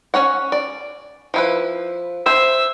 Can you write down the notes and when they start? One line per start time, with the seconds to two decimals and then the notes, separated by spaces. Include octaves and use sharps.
0.14 C#4 C#5 F#5
0.52 D5
1.34 F3 E4 B4
2.26 C5 E5